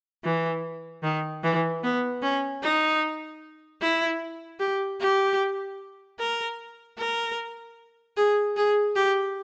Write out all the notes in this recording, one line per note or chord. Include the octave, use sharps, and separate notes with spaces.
E3
D#3
E3
B3
C#4
D#4
E4
G4
G4
A#4
A#4
G#4
G#4
G4